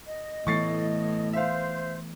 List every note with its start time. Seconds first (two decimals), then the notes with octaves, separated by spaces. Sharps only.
0.06 D#5
0.47 A2 E3 A3 B3 C#6 A6 C7
1.33 C5 E5 F5